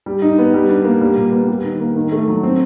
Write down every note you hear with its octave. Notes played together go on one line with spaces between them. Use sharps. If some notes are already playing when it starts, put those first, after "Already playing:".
G3
D#4
B3
G3
D4
A#3
G3
A#2
B3
G3
D#3
A#3
D#3
A3
F#3
C4